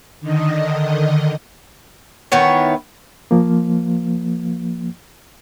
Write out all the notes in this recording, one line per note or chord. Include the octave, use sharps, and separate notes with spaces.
D3 D#3 D#5
D#3 E3 B3 C#5
F3 A#3